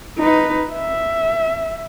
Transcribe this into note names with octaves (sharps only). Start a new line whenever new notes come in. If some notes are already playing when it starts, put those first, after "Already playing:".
D#4 B4
E5